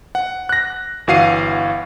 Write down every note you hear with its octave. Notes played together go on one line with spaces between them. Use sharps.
F#5
F#6 A#6
G1 E3 F#4 F5 C7 D#7